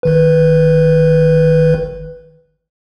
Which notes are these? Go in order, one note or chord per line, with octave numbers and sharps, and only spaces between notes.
G1 D#3 B4